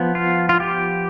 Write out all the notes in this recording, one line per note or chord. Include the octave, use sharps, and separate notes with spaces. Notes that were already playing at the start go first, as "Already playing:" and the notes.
Already playing: F3 B3
F4
F4
G4